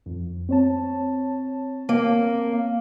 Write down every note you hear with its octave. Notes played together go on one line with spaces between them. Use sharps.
F2
C4 C#5 A5
A#3